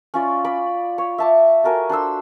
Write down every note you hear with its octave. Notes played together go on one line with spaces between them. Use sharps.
C#4 F4 D5
D5 B5
C#5
E5 A5 D6
F#4 A4 A#4 G#5
D4 A4 C5 E6